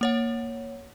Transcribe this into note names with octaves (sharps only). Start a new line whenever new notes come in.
A#3 C#5 F#5